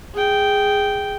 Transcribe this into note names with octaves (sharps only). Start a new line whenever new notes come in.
G#4 G5